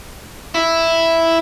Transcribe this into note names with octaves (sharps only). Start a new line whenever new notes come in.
E4